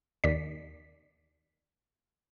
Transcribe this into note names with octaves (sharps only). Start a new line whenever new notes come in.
D#2 D5 B6